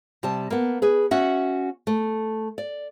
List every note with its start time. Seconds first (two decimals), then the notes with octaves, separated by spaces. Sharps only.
0.23 C3 G3 A5
0.50 A#3 B3
0.82 G#4 B4
1.11 C#4 F#4 E5 F#5
1.87 A3
2.58 D5